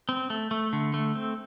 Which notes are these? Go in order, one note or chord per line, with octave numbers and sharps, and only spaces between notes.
C4
A3
A3
D3
A3
C4